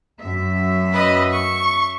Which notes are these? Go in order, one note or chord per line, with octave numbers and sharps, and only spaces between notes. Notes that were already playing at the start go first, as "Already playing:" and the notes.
F#2 E5
B4 D#5
C#6